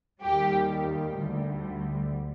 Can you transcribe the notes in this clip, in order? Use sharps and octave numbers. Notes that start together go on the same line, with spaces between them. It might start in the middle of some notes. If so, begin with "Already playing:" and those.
D#2 D#3 G3 G4
D2 D3 G3